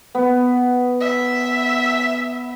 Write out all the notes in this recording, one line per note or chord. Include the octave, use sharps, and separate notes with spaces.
B3
E5